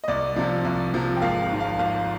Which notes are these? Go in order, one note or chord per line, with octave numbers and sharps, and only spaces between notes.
D#5
C2 D5
C3 F3
C2
C3 F3
G5
G#1 F5
G#2 F3
F5
G#1 F5